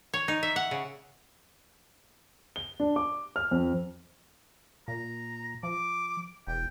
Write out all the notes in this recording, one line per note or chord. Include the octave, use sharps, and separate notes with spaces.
C#5
D#4
E5
F#5
C#3
G7
D4
D6
F6
F2
A#2 A#5
F3 D6
E1 G5